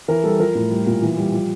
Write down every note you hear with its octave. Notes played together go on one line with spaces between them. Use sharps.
E3 A#4
G3 A4
F3 A#4
A2
G3
A#2
E3
G3
F3